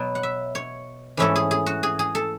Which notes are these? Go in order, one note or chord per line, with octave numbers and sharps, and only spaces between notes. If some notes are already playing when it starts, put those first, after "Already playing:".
Already playing: B2 F#3 B3
F#5
E5
C#5
G#2 E3 A3 C#4 E4 A4
G#4
G#4
F#4
G#4
G#4
A4